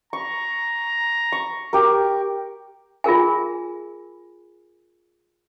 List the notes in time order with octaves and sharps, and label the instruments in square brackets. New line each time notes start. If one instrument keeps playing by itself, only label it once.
[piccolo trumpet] A#5 [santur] C#6
[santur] C#6
G4 A#4
[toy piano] F4 G#4 A#4 G#5